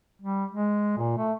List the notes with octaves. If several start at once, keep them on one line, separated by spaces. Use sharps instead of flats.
G3
G#3
A#2
A3